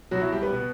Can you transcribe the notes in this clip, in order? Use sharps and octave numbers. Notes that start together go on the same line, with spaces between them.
B2 F#3 F#4
E3 E4
G3 G4
B3 B4
B2